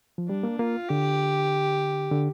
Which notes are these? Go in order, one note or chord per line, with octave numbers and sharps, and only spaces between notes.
F3
G3 D4
A#3
A#3 F4
D3 G4
D3